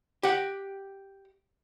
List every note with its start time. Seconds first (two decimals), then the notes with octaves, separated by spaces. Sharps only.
0.23 G4 F#5